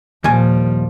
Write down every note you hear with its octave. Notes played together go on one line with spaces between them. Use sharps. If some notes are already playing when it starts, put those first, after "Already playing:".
D#2 A#2 F3 G3 G#5